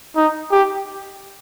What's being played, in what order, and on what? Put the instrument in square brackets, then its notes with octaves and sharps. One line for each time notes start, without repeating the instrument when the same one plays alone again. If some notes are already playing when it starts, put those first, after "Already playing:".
[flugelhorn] D#4
G4